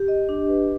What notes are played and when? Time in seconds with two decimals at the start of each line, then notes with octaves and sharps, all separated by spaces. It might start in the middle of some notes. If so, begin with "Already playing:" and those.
Already playing: G4
0.08 D#5
0.29 D4
0.49 B4